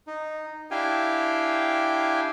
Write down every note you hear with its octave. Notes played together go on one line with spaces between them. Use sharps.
D#4
D4 E4 G4 F5 G5 G#5